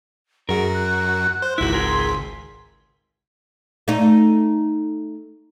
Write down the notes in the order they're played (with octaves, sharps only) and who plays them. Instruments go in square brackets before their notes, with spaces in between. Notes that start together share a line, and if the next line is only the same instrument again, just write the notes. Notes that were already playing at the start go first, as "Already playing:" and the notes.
[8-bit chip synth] F#2 F#4 [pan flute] G#4 [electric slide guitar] A#4
[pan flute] F#6
[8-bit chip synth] C5
[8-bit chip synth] G#1 C#2 B6 [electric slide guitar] E4 F#4
[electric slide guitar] G#4 A#4 [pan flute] C6
[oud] A3 D#4